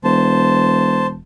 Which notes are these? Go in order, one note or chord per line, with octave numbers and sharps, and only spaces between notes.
E1 C5 A5